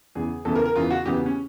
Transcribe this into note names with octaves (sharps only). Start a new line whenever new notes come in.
E2 C#3 E3 G#4
E2 C#3 E3 A4
A#4
A#4
E2 C#3 E3 F4
F#4
E2 C#3 E3 G4
C#4